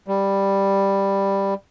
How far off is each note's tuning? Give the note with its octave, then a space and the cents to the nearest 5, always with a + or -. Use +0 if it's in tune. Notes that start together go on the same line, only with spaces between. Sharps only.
G3 +5